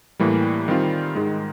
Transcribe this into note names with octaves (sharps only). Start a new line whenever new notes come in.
A2 E3 G3 A#3
D#3 G3 C4 F4
G#2 D#3 G#3